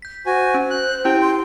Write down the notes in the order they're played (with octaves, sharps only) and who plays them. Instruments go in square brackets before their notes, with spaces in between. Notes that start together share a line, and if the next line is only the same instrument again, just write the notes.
[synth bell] G6 B6
[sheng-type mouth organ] F#4 G#5 [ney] C5
[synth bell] C#4
[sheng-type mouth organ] F#6
[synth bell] C#4 E4 G4 [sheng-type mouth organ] G5
[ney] C6